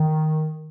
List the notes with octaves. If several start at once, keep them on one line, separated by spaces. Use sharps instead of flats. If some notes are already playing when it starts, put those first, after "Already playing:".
Already playing: D#3